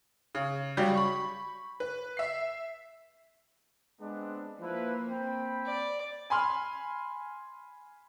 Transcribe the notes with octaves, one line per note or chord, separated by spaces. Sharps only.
C#3
C#3 F#3 G3 F#4 G4
B5 C#6
B4
E5 C7
G#3 B3 C4 D4
F3 A#3 E4 B4
C4 G5 B5
D5
G#5 B5 C6 F6